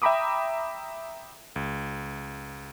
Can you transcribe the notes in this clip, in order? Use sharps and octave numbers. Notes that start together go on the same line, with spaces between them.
E5 G5 A#5 B5 D6 D#6
C#2